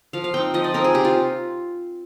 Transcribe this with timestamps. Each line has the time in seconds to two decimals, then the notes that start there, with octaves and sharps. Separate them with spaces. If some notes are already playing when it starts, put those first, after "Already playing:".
0.13 F3 F5
0.24 F5
0.34 C4 D#4 G5
0.54 F3 D#5
0.64 D5
0.74 C4 D#4 A#4
0.84 G#4
0.94 C3 G4
1.05 F4